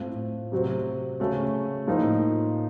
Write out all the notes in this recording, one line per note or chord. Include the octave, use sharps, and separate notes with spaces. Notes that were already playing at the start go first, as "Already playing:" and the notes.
Already playing: A2 A3 C4 F4
C3 F#3 C4 F#4
C#3 A3 C#4 F#4
A2 F3 A#3 D#4